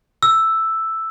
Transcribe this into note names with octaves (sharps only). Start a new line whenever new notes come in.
E6